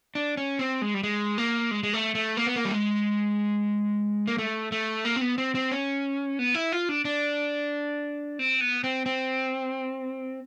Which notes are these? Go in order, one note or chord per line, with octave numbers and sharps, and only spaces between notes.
D4
C#4
C4
G#3
G3
G#3
A#3
G#3
G#3
A3
A3
A#3
B3
A#3
G3
G#3
A#3
A3
A3
A#3
C4
B3
C4
C4
C#4
B3
E4
F4
D4
D4
C4
B3
C4
C4